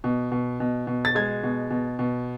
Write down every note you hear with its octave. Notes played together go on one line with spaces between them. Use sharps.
B2
B2
B2
B2
A6
G#3 G#6
B2
B2
B2